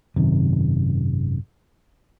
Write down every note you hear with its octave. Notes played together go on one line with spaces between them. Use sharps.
G#1 F#2 C3 D#3